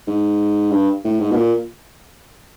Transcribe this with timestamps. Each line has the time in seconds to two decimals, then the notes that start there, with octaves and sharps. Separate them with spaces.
0.08 G#2
0.71 G2
1.05 A2
1.20 G#2
1.31 B2
1.36 A#2